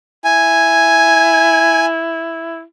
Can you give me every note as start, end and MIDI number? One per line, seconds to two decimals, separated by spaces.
0.24 2.63 64
0.24 1.85 80